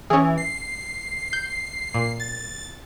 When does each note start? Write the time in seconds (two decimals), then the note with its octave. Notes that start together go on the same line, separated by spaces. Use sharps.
0.10 E3 C#4 G#4
0.38 C7
1.33 G6
1.94 A#2
2.20 A6